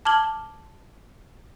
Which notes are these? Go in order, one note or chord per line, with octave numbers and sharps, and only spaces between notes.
A5 D6 F6 G#6 F#7 G7